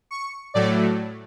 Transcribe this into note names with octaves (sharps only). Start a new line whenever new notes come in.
C#6
A2 F#3 A3 D5